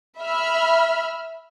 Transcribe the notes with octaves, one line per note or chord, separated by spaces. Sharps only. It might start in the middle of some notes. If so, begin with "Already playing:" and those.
E5 B5 F6